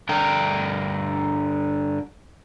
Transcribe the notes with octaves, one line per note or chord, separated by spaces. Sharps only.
G2 D3 A#4 G5